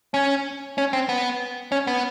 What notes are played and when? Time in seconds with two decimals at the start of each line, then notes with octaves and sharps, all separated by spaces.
0.14 C#4
0.78 C#4
0.93 C4
1.09 B3
1.72 C#4
1.87 B3